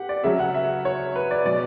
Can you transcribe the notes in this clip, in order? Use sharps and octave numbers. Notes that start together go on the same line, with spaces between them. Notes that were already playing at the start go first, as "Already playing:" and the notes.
Already playing: G4 F#5
D5
C#3 F#3 E5
F#5
E5
C#5
B4
D5
B2 F#3 D5